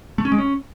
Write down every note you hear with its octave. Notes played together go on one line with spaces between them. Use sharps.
A3
C#4
G#3
C#4